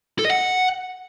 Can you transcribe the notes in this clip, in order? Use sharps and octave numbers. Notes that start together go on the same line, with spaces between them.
A4
D#5
F#5